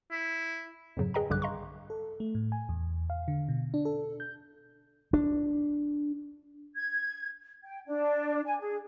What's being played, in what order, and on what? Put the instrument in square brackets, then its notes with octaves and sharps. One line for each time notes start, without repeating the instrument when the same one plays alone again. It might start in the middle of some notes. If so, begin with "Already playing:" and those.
[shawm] E4
[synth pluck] F2 G#2 C#3 F#3
G#4 B4 D#5 G5 G#5 A#5
B1 G2 D3 G3 D6 F#6
D#5 F5 A#5 C6 C#6
[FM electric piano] A4
A3
A2
G#5
E2
F5
D3
B2
D4
A4
G6
[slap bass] D4
[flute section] G#6
G5
D4
G#5
G#4